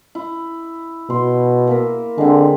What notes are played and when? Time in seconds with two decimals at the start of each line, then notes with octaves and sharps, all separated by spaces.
0.15 E4
1.10 B2 C6
1.67 A#3 A#4 E5
2.18 D3 G#3 C4